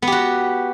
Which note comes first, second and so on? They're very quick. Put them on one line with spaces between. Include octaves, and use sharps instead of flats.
B3 G4 F#4